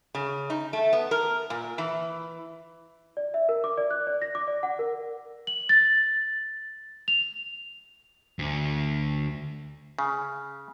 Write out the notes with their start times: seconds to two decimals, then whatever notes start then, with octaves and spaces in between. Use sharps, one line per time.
0.15 C#3
0.50 D#4
0.73 A3
0.93 B3
1.11 A#4
1.50 A#2
1.78 E3
3.17 D5
3.34 E5
3.49 A#4
3.64 D6
3.78 D5
3.91 F#6
4.07 D5
4.22 A#6
4.35 D6
4.48 D5
4.63 F#5
4.79 A#4
5.47 F#7
5.69 A6
7.08 F7
8.39 D2
9.99 C#3